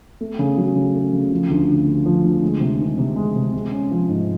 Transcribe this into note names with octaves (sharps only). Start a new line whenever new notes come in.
A3
C#3
F#3
C#3
A3
C#3
F3
D2
D3
D2
F3
D2
G#3
C3
D#3
C3
G#3
C3
G#3
C#4
F3
G#2